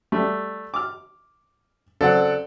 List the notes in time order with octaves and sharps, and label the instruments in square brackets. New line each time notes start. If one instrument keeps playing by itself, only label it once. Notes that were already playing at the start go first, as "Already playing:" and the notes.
[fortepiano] G3 A3
D6 F6
[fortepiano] C#3 F#3 C4 [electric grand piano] A4 D5 F#5